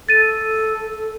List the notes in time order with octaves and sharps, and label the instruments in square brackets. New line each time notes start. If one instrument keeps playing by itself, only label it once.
[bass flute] A4 [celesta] A6 D#7